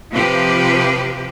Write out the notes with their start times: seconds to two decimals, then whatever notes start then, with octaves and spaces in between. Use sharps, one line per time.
0.11 C3 F3 G4 B4